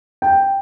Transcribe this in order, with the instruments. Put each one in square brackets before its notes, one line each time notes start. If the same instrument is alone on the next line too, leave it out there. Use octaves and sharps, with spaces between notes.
[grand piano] G5